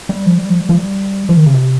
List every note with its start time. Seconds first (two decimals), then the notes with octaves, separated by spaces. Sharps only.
0.09 G3
0.26 F3
0.38 G3
0.50 F3
0.60 G3
0.69 F3
0.78 G3
1.29 F3
1.37 D#3
1.46 C#3
1.54 C3